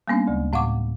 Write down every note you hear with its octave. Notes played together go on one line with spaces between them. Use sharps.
G3 A#3 B3 C#4 D4
D2 C#3 G#3
A2 F5 F#5 C#6 D6